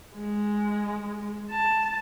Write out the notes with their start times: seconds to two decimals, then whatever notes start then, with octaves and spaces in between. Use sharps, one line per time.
0.15 G#3
1.51 A5